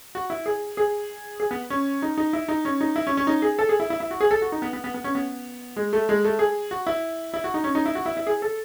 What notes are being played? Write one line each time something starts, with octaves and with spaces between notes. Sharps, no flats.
F#4
E4
G#4
G#4
G#4
B3
C#4
D#4
D#4
E4
D#4
C#4
D#4
E4
C#4
C#4
D#4
G#4
A4
G#4
E4
E4
E4
F#4
G#4
A4
F#4
D#4
B3
B3
B3
B3
C#4
B3
G#3
A3
G#3
A3
G#4
F#4
E4
E4
F#4
D#4
C#4
D#4
E4
F#4
E4
E4
G#4
A4